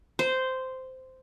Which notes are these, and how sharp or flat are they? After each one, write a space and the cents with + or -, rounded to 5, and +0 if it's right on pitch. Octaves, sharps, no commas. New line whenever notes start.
C5 -10